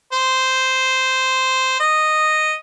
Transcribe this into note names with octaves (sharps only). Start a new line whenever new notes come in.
C5
D#5